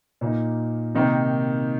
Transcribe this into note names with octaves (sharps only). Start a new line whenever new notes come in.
A#2 A#3 D#4
C3 D#3 A#3 D#4